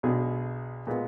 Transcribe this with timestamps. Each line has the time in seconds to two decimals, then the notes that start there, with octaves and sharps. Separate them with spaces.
0.03 B1 B2 G#3 D4 G#4
0.87 A#2 G#3 B3